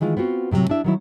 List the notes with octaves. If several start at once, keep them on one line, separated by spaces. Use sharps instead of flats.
D#3 E3 G#3 F4
B3 C4 F4 F#4
A2 C3 D#3 F#3
D4 E4 E5
D#3 F#3 E4